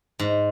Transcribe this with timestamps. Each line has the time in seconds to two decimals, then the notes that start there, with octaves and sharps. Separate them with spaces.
0.19 G#2